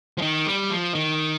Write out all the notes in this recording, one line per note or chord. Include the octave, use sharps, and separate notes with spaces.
F3
D#3
G3
F3
D#3